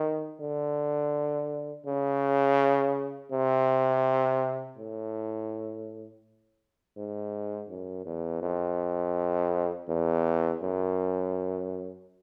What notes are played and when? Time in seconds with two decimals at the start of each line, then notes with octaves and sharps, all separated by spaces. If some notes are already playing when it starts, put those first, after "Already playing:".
Already playing: D#3
0.40 D3
1.86 C#3
3.31 C3
4.77 A2
6.97 G#2
7.69 F#2
8.05 E2
8.42 F2
9.88 E2
10.62 F#2